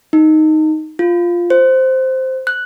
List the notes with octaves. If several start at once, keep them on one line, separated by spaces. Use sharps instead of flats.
D#4
F4
C5
F#6